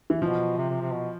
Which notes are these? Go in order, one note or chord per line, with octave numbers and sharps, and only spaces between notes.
E3
B2 F3
C3
C3
C3
B2